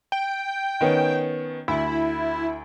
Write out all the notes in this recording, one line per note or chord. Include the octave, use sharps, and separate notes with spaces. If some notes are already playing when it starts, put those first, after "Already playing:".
G5
D#3 B3 C#4
D2 E4